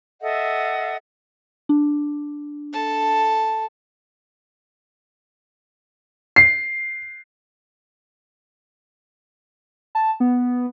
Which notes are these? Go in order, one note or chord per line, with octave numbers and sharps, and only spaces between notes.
A4 D#5 E5 F#5
D4
A4 A5
C7
A5
B3